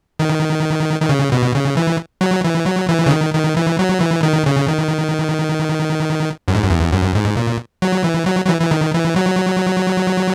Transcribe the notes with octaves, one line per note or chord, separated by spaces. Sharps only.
D#3
D#3
C#3
B2
C#3
E3
F#3
E3
F#3
E3
C#3
D#3
D#3
E3
F#3
E3
D#3
C#3
D#3
F#2
G#2
F#2
E2
F#2
G#2
A#2
F#3
E3
F#3
F#3
E3
E3
D#3
E3
F#3